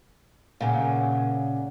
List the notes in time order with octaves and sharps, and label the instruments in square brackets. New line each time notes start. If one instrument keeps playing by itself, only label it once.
[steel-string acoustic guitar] A#2 C#3 [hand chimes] F5 F#5 G#5